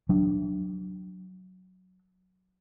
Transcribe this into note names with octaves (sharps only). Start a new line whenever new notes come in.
F#3 D4